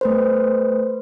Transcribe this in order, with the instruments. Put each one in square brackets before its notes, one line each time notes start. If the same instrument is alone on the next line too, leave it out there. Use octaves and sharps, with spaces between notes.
[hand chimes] A3 B4 C5